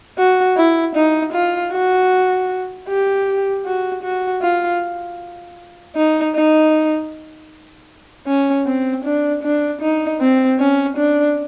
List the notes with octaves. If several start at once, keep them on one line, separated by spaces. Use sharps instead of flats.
F#4
E4
D#4
F4
F#4
G4
F#4
F#4
F4
D#4
D#4
C#4
C4
D4
D4
D#4
C4
C#4
D4